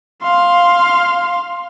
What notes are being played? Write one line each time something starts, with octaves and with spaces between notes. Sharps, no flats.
F5 C6